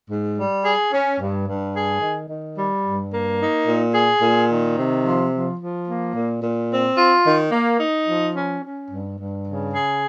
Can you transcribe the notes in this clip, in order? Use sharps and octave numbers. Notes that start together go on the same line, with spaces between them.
G#2
G3
G#4
C#4
G2
G2
G#4
D#3
D#3
G3
G2
A#3
D#4
A#2
G#4
A#2
D#3
C3
F3
F3
F3
A#3
A#2
A#2
C4
F4
D#3
A#3
D#4
F3
C#4
C#4
G2
G2
C#3
G#4